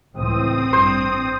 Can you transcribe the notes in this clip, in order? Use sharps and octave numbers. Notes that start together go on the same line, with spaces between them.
C#2 A2 E3 C4 D#6
A1 G2 C5